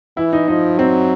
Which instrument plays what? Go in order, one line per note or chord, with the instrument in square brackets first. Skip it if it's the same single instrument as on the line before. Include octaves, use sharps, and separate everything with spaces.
[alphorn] E3 [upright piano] E4
[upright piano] D#4
[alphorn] F3 [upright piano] D#4
[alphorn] F#3 [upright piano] C4